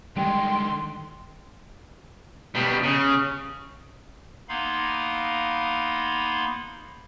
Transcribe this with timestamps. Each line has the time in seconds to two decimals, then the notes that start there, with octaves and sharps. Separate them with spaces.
0.16 D3 D#3 G3 G#3 G5 C6
2.55 B2 G3
2.83 C#3
4.49 A#3 B3 D#4 F5 B5 C6